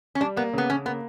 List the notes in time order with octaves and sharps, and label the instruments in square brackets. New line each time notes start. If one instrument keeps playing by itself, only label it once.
[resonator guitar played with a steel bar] C#4
[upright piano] G3 [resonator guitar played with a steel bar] D4
[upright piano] A#3 [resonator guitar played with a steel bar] B3
[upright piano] C#3 [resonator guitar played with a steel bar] B3
[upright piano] C#3 [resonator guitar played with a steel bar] C#4
[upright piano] A#3 [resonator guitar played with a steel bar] B3